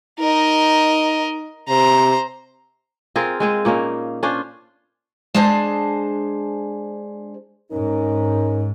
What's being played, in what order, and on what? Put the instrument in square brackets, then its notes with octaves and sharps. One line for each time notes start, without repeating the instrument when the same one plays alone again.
[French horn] D#4 [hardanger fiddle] A#4 D#5
[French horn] C3 [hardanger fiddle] C5 A#5
[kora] C4 F4 G#4 A#4
G#3 C4 G#4
A#2 A#3 C#4 D#4
C#4 D4 F4 C5
[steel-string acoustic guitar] G#3 D4 G#4 C5 A5
[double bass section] G#2 [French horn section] C#4 D#4 A#4